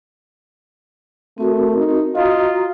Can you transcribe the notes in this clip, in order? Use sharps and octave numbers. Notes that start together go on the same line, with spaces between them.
A3 C4 F#4 A#4
D#4
F4 F#4 D#5 A#5 D#6